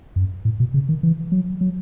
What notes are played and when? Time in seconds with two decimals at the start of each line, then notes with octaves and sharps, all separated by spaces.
0.16 F#2
0.45 A2
0.60 B2
0.74 C#3
0.89 D#3
1.03 E3
1.32 F#3
1.61 F#3